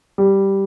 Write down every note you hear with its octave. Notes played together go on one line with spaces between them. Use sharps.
G3